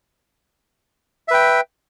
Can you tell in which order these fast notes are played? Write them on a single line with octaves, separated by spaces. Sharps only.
E5 B4 G5